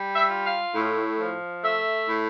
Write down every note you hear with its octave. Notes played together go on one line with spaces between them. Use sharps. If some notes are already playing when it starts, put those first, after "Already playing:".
Already playing: G3
E5
F4
F5
A2
F3
A3 E5
A2